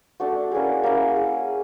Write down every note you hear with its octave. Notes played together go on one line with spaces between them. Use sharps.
A3 D4 F#4
A#3 C#4 E4 G#4
A#3 C#4 E4 G#4
G#4